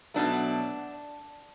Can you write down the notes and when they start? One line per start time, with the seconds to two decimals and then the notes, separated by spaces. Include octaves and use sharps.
0.14 B2 F#3 A3 D4